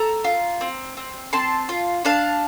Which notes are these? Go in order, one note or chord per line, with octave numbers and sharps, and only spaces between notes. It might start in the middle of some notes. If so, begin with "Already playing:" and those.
Already playing: A4 A#5
F4
C4
C4
C4 A5 C6
F4
D4 F5 A5